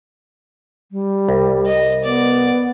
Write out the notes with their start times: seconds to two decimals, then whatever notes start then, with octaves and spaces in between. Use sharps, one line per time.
0.92 G3
1.29 C2
1.67 D#5
2.05 B3 D5